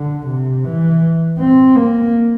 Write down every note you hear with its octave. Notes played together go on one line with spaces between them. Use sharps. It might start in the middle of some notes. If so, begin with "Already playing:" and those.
Already playing: D3
C3
E3
C4
A#3